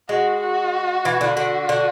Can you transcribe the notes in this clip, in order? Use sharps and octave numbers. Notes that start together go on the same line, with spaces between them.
G#3 F#4
F#4
E3
D3
D3 F#4
D3